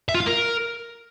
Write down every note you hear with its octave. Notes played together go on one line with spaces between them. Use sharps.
E5
F4
F5
A#4